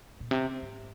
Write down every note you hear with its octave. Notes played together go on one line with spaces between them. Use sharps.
A#2
C3
G#2